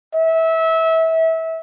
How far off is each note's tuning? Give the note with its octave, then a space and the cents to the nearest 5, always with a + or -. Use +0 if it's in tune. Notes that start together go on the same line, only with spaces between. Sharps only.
E5 -25